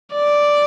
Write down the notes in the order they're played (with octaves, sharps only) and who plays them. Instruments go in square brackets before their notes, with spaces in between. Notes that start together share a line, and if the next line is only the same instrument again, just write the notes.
[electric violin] D5